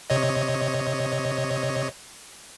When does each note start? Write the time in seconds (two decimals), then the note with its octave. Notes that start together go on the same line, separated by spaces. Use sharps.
0.10 C3 C#5 D#5